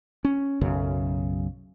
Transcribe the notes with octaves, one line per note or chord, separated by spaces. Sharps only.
C#4
B1 F#2 C#3